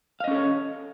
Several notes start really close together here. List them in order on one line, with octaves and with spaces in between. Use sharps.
F5 D#5 C#4 A4 C#5